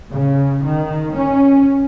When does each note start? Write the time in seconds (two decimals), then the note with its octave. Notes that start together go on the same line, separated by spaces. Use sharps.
0.12 C#3
0.65 D#3
1.16 C#4